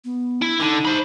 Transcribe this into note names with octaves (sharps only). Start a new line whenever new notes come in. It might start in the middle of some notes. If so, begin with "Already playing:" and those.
B3
E4
D3 D#4
C5 B5